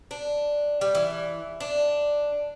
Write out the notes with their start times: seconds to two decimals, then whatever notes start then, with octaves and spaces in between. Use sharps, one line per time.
0.11 D4
0.81 G3
0.95 E3
1.61 D4